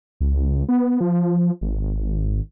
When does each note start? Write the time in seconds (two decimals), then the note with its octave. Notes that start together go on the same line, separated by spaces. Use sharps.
0.21 C#2
0.69 B3
1.01 F3
1.61 G#1